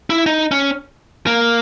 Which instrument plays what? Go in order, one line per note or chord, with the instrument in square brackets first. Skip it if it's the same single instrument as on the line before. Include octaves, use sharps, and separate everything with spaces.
[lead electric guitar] E4
D#4
C#4
A#3